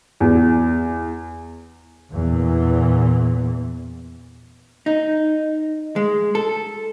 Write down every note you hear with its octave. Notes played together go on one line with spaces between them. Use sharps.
E2
E2 A#2 E3
D#4
G#3
A4